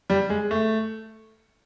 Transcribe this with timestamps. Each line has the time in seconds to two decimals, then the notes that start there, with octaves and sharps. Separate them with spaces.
0.10 G3
0.30 G#3
0.51 A3